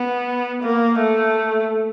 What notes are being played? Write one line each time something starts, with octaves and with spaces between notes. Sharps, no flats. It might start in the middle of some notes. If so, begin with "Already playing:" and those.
Already playing: B3
A#3
A3